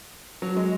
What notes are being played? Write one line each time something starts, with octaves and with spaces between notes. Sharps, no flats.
F#3
G#3